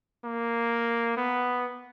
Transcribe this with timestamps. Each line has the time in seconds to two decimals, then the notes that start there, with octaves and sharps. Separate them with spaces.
0.25 A#3
1.17 B3